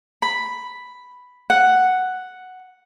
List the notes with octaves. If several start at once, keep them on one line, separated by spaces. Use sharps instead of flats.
B5
F#5